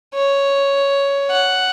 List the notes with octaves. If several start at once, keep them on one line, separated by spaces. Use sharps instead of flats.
C#5
F#5